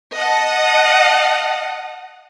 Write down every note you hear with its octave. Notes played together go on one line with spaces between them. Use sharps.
D#5 F#5 A5